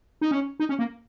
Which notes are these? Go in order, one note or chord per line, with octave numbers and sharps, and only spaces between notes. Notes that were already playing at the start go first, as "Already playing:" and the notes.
D#4
C#4
D#4
C#4
A#3